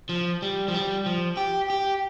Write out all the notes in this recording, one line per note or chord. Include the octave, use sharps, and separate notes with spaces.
F3
G3
F3
G3
F3
G4
G4